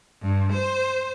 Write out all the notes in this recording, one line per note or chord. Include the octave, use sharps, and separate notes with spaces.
G2
C5